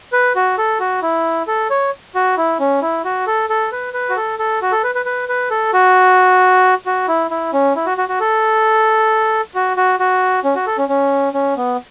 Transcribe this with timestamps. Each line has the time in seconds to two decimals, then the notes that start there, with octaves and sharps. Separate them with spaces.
0.13 B4
0.35 F#4
0.58 A4
0.80 F#4
1.02 E4
1.48 A4
1.70 C#5
2.15 F#4
2.37 E4
2.60 C#4
2.82 E4
3.05 F#4
3.27 A4
3.50 A4
3.72 B4
3.94 B4
4.10 F#4
4.17 A4
4.39 A4
4.62 F#4
4.72 A4
4.84 B4
4.95 B4
5.06 B4
5.29 B4
5.51 A4
5.73 F#4
6.86 F#4
7.08 E4
7.31 E4
7.53 C#4
7.76 E4
7.86 F#4
7.97 F#4
8.09 F#4
8.20 A4
9.55 F#4
9.77 F#4
9.99 F#4
10.44 C#4
10.55 F#4
10.67 A4
10.78 C#4
10.89 C#4
11.34 C#4
11.57 B3